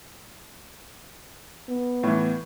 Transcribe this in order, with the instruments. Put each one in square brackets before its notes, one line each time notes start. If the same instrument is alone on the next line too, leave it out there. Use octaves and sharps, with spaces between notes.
[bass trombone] B3
[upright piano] A2 E3